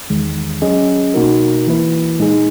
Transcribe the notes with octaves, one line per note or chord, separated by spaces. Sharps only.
E2 D#3 G#3
F#3 C#4 G#4 D#5
B2 A#3 D#4 F#4 A#4
E3 A#3 E4 B4
A#2 G#3 D#4 G#4